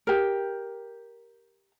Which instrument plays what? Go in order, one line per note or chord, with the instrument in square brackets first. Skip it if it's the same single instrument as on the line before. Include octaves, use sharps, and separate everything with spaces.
[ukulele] G4 A#4